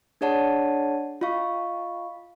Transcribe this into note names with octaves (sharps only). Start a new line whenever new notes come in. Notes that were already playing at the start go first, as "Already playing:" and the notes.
D4 G#4 C#5 D5 F#5 A5
F4 D#5 F5 C#6